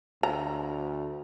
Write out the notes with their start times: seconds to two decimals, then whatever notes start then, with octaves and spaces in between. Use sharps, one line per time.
0.23 D2 A#5